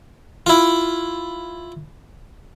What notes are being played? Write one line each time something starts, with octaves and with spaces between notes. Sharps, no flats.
E4 F4